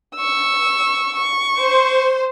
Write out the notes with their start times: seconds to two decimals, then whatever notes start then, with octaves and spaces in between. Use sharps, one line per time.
0.16 C#6 E6
1.16 C#6
1.58 C5